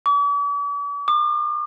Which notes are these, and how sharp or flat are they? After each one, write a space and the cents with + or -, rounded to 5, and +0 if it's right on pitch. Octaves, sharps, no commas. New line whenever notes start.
D6 -45
D6 +45